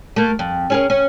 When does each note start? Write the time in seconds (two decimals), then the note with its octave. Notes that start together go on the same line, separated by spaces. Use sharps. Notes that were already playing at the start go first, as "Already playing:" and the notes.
0.16 A3 A#3
0.39 F2
0.70 C#4 G#4 A#4
0.90 C#4